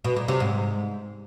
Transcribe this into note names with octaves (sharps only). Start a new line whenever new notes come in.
B2
A#2
C3
G#2